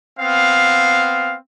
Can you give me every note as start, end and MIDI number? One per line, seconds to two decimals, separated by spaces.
0.19 1.36 59
0.19 1.36 60
0.19 1.36 77